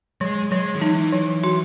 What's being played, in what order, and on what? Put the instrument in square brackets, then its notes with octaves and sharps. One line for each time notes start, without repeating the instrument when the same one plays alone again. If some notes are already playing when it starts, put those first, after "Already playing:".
[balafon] F#3 [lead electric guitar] G#3
[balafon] F#3 [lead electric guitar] G#3
[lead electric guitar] D#3
[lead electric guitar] E3 [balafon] D#4
[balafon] F#3
F#4